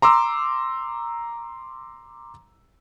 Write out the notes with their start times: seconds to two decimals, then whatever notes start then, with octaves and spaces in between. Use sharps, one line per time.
0.02 A#5 C6 D6 E6